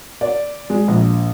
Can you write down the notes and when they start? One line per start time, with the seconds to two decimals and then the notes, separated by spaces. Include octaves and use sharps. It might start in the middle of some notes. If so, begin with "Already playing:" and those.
0.21 D5
0.70 G#3
0.88 A#1